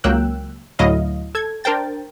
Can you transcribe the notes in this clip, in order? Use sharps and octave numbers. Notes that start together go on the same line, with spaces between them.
C#2 F#3 A#3 G5 E6 F#6
D2 A2 F#3 E4 D#5 F5
A4 G#6
D4 A#4 C5 G5 A6